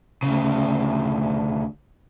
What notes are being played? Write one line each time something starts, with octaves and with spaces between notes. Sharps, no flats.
D2 C#3